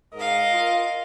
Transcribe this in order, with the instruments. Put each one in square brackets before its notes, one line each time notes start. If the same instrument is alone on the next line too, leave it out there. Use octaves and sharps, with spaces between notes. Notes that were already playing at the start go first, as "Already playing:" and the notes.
[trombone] G#2 [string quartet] A#4 F5 [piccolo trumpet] D#5
[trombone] F4